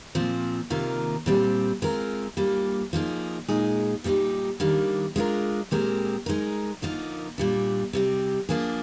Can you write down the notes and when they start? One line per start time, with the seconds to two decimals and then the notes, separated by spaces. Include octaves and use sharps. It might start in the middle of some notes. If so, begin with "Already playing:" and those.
0.15 A#2 F3 C4
0.70 C3 D#3 A#3 F4 A#4
1.26 A#2 G3 C4 G4
1.82 G#3 C4 F4 A#4
2.37 A#2 G3 A#3 D4
2.93 F3 A#3 D#4 G#4
3.48 A#2 G#3 D#4 G#4
4.04 A#2 G3 C4 D#4 G4
4.60 D#3 G3 A#3 D4
5.16 G#3 D4 F4 A#4
5.71 A#2 G#3 C4 G4 A#4
6.26 G#3 D#4 A#4
6.82 D3 F3 A#3 D#4 A#4
7.38 A#2 G3 D4
7.93 C3 G3 C4
8.49 F3 A#3 D4 G#4